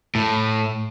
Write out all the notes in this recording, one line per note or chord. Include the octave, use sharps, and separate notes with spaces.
A2